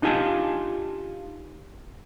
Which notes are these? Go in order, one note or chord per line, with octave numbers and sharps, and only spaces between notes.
D4 D#4 F4 G4 G#5 A5